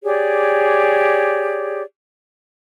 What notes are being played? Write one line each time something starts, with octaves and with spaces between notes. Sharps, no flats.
G4 G#4 C#5 D5